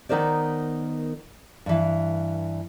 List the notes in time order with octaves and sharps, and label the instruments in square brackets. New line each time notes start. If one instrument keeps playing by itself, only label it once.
[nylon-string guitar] D#3 B3 D#4 A#4 C5 D5
G2 E3